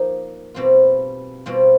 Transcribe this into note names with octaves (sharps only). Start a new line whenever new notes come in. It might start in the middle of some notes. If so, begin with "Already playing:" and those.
Already playing: F3 A#3 D#4
B2 G3 C4 F4
B2 G3 C4 F4